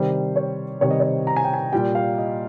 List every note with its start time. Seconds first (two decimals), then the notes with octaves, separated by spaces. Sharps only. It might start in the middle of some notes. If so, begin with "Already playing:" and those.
Already playing: C3 D#3 G3 C5
0.36 C#5
0.81 C3 D#3 G3 C#5
0.91 D#5
1.00 C#5
1.27 A#5
1.36 G#5
1.44 G5
1.54 G#5
1.73 A#2 G3 G5
1.95 F5
2.18 D#5